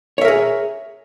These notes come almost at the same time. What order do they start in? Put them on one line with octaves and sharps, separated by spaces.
C#5 E5 A#4 G#4